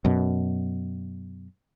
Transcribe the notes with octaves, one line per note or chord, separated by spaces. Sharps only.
F#2 B2